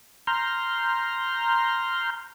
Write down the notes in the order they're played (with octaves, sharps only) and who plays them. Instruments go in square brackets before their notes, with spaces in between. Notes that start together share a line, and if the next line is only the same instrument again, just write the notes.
[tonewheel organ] A#5 C6 F6 G6